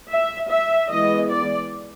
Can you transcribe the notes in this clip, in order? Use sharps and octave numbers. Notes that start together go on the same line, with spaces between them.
E5
E5
E3 G#3 B3 D#5
D5